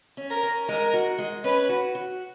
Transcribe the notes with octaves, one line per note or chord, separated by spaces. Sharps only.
C#4
A#4
C#4
G#3 A#4
F#4
G#3
C#4 B4
F#4
F#4